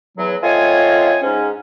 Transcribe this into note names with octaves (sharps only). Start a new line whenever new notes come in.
E2 F#3
A3 C4 F4 C#5 D#5 G#5
G#2 C#4